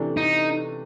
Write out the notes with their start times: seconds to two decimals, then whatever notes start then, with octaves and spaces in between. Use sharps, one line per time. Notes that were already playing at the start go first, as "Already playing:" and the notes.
Already playing: C3 E3 A3 D4
0.17 D#4